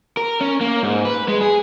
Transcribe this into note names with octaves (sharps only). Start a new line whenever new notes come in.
A#4
C#4
A#3
G#2
B4
G#3
G#4